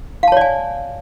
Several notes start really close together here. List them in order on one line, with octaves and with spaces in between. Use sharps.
F5 A5 C#5 D5 G#5